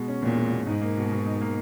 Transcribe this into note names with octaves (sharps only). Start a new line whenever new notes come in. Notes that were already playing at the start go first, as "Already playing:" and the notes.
Already playing: B2 G#3
C#4
E2 A#2
G#3
B2
G#2 D#4
A#3
B2
B2
D#4
A#3